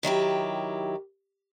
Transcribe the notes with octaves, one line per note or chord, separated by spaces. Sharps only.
D#3 F#3 E4 G4